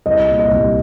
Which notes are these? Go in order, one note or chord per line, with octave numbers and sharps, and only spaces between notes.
C2 D#5
A#2
D#5
C2